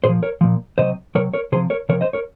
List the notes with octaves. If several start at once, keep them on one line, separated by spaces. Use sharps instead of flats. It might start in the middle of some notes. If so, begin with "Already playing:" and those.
A#2 G#4 C5
F3
A#4 C#5
A#2 F3
C3 F#3 C5 D#5
C3 F#3 A#4 C#5
A#4 C#5
C3 F3 G#4 C5
A#4 C#5
C3 F3 A#4 C#5
C5 D#5
A#4 C#5